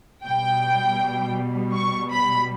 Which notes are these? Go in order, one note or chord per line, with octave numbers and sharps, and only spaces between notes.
B2 G3 G5
C#6
B5